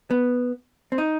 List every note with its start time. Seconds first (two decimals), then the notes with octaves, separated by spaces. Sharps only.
0.11 B3
0.92 C4
0.98 D#4